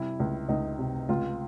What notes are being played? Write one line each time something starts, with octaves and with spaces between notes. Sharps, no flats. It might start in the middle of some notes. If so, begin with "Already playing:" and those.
Already playing: C3 G3 E4
C#2
C#2 D#4
C3
C#2 F4